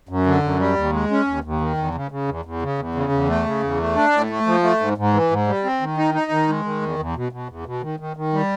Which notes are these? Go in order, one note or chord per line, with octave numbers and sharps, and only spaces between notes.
F#2
D3
F#2
G3
D#2
G#3
C#4
D#2
D#2
D#3
E2
C#3
C#3
E2
E2
C#3
E2
C#3
E2
A3
C#3
E2
A3
D4
A2
A3
F3
A3
G#2
G#2
E3
G#2
G3
C4
D#3
D#4
D#4
D#3
G#3
D#3
E2
E2
B2
B2
E2
B2
D#3
D#3
D#3
G3